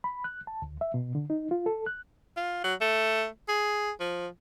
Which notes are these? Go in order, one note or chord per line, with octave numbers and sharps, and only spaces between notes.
B5
F#6
A5
D2
E5
B2
D3
D#4
F4
A4
F#6
F4
F#3
A3
G#4
F3